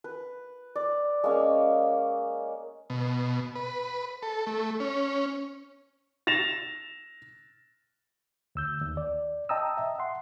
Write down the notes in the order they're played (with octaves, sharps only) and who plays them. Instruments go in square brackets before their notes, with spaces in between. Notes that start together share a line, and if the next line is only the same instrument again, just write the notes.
[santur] B4
D5
G#3 A#3 C#4 F5
[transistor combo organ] B2
B4
A4
A3
C#4
[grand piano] A6 A#6 E7 F7
[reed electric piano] D2 E6 G6
D#2
D5
D#5 G5 A5 A#5 D#6 E6
E5
F#5 C6